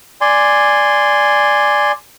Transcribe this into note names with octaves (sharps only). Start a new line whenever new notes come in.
D5 G#5 C6